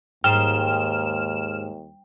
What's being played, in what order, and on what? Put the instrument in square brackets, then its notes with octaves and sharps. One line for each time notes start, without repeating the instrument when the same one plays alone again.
[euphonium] D#2 [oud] G#2 [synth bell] G5 [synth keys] F6 E7